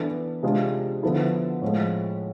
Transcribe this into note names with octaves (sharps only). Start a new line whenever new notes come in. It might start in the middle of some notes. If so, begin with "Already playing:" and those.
Already playing: E3 B3 D4 A4
C3 G#3 D4 F4 G#4
D3 F3 B3 E4 A4
A2 F3 G#3